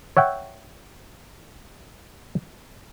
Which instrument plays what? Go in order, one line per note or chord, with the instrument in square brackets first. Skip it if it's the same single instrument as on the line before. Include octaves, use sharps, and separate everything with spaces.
[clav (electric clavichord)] C#5 E5 F#5 G5